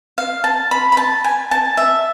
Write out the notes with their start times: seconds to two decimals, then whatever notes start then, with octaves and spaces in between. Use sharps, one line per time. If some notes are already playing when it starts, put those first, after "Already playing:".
0.18 F5
0.44 A5
0.71 B5
0.92 B5
0.97 A5
1.24 G#5
1.51 A5
1.77 E5